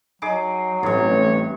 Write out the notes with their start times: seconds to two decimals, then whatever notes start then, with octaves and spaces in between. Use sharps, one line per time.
0.22 F#3 D#4 G#4 D6
0.83 A1 G2 C3 C#5